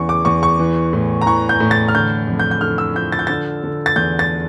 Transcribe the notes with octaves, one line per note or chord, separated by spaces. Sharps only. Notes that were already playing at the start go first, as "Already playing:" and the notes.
Already playing: E2 C#3 E3 C#6
D6
E2 C#6
C#6
E3
A2
A#5
E3 C#6
G6
A2
A6
F6
D3 G6
F2
G6
G6
D3 F6
E6
F3 G6
A6
G6
D3 A6
D3
A6
E2 G6
A6